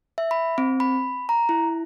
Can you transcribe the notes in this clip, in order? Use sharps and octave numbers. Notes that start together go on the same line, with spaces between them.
E5
B5
C4
B5
A#5
E4